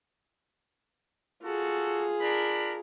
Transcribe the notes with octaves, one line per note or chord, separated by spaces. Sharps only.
F4 F#4 G#4 A4
D4 A#4 B5